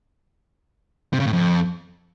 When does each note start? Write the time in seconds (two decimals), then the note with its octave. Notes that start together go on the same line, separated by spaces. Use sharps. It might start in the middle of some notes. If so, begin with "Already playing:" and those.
1.13 C3
1.20 C#3
1.26 A2
1.33 F2